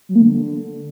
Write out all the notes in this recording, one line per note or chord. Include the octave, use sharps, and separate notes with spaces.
F#3
A#3
D3